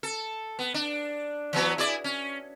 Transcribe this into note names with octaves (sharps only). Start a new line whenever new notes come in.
A4
B3
D4
E3 F#3 B3
E4 G#4 D5
C#4